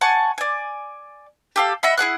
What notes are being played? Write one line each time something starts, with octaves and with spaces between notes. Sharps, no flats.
F#5 G#5 A5 C#6
D5 G#5
G4 A4 F5
D#5 E5 F#5 B5
E4 G#4 F#5 F#6